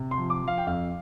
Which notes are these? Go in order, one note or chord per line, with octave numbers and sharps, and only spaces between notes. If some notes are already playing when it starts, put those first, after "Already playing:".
Already playing: C3
C6
F3
D6
F3
F5
G5
F2 F5